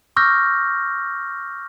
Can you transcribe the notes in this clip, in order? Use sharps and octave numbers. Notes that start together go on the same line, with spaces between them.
C#6 D6 E6 F6 G6 A#6